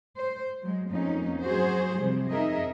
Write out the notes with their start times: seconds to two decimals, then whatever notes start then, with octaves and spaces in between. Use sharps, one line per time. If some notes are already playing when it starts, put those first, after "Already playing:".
0.17 C5
0.61 F#3 G#3
0.91 F2 A#3 C#4 D#4
1.42 F#3 F#4 G#4 C5
1.97 C3 F3 G3
2.30 F2 D#4 G#4 A#4 D#5 E5